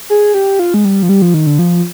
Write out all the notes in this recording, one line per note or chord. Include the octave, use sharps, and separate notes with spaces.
G#4
G4
F4
G#3
G3
F3
G3
F3
D#3
D3
F3